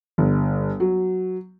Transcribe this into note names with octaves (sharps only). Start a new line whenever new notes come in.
G1
F#3